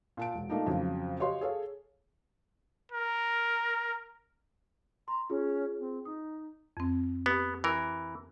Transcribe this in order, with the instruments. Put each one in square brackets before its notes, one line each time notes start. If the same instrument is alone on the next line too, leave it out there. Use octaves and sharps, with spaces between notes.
[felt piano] A#2 A5 D7
E1
A3 A#3 D4 D#4 F4
F2 C#3 F#3
F#4 G4 C#5 D#5 F5 C6
G#4 A4 C#5 F5
[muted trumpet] A#4
[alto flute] A#5 [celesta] C6
[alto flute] C#4 [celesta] F4 G#4
[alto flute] C4
[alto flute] D#4 [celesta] D#6
[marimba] F2 C4
[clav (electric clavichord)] B3 [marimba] G4
[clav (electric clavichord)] E3 A#4